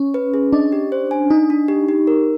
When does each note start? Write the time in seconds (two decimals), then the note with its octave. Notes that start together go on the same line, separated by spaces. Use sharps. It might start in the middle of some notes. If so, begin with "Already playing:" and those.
Already playing: C#4
0.14 B4
0.34 G#4
0.53 D4 D#5
0.72 G4
0.92 C5
1.11 G#5
1.30 D4 D#4
1.50 D4
1.68 G4
1.89 G4
2.07 A#4